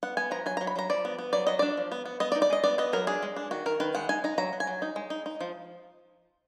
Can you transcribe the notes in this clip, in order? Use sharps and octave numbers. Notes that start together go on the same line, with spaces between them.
B3 F#5
B3 G#5
F3 A#5
F#3 G#5
F#3 A#5
B5
F#3 A#5
F3 D5
B3
B3
F#3 D5
F#3 D#5
D4 D5
F3
B3
B3
B3 D#5
D5
D#4
D5
G#3 D#5
B3 D5
B3 D#5
F#3 A#4
D4 G#4
G#3
D4
D#3 F#4
D#3 A#4
D#3 B4
G#3 F#5
D#4 G#5
D#4 A#5
F#3 A#5
F#3
G#5
F#3
D#4
G#3
D#4
D#4
F3